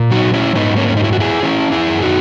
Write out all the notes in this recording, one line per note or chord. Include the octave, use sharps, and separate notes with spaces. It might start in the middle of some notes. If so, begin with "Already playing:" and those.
Already playing: A#2
F#3 D#4 F#4
C#4 E4
G#2 B3 D#4
A#3 C#4
C#4
F#3 D#4
E4
F#4
E4 G#4
E3 C#4 E4
E4 G#4
F#2
D#4 F#4